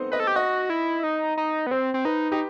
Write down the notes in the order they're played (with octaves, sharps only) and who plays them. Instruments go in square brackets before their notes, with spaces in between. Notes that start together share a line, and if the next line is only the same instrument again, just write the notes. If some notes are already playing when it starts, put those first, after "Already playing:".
Already playing: [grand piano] A3 B3 C4 D#4 C5
[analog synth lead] B4 [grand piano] D#5
[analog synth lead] A4
G4
[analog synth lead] F#4 [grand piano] D#5
[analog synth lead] E4
D#4
D#4
B3
[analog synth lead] C4 [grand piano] C5
[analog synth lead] C4
[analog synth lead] D#4 [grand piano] B4
[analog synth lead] D#4 [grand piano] G4